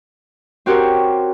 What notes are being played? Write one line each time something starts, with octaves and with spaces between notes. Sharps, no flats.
C4 F#4 G4 A#4 C#5